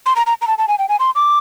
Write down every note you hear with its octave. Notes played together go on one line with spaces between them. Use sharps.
C6
A#5
A#5
A#5
A5
A5
G#5
G5
G#5
C6
D6